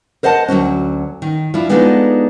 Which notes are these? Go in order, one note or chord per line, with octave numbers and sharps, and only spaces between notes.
A#4 C5 D#5 F#5 A5
D2 G2 F#3 C#4
D#3
F3 D4 E4
G#3 B3 D4 D#4 F4 A4